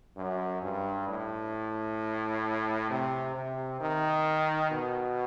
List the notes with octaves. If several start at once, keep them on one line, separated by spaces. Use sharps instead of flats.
F#2
G2
A2
C3
C3
D#3
B2